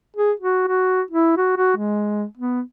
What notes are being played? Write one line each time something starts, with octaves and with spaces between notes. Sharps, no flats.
G#4
F#4
F#4
E4
F#4
F#4
G#3
B3